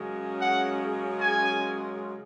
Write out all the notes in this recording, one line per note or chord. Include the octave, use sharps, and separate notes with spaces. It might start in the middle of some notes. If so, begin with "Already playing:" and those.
Already playing: F#2 C#3 G#3 C#4
F#5
G#5